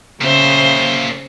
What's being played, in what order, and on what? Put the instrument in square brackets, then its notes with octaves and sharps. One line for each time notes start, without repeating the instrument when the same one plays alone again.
[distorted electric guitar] A#2 E5 [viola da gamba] C#3 C5